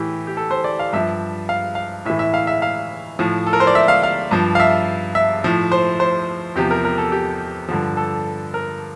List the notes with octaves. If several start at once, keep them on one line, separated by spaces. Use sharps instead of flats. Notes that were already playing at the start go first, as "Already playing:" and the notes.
Already playing: A2 E3 G4
G4
A4
C5
D5
F5
G2 F3 E5
F5
F5
A2 E3 E5
E5
F5
E5
F5
A2 F3
A4
A#4
C5
D5
E5
F5
F5
G2 F3
F5
E5
E5
A2 F3
C5
C5
E2 C3 F3 G4
A#4
A#4
A4
G4
G2 D3 F3
A4
A#4